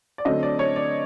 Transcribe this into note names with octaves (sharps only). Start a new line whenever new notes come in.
D5
D3 F#3 A3 C4 D#5
D5
C#5
D5